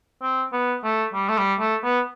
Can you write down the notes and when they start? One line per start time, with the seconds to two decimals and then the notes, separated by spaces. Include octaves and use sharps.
0.22 C4
0.53 B3
0.84 A3
1.14 G3
1.29 A3
1.38 G3
1.60 A3
1.84 B3